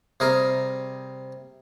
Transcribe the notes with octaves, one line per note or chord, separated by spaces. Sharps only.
C3 G3 G#4 A#4